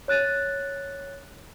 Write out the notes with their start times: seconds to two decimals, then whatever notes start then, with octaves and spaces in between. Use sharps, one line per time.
0.08 C#5 F#6 A6 D#7